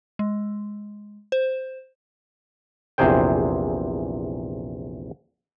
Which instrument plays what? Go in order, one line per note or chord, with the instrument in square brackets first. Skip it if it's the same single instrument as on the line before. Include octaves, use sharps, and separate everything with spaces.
[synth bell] G#3
C5
[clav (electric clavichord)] A#1 E2 C3 G#4 C5 G5